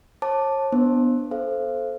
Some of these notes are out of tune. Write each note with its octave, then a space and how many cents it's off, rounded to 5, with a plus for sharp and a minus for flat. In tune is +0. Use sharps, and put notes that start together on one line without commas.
C#5 -40 A5 +0 D6 +0
B3 +0 D4 +0 C5 +25
A4 -15 C5 +0 F5 -35